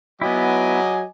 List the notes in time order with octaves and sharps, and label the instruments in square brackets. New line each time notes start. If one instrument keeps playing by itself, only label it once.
[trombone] F#3 [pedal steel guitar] B3 E4 [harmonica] D#5 G#5 D6